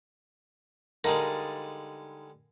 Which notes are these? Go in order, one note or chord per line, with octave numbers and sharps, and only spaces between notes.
D3 G3 G#3 D#4 A#4 F5 A5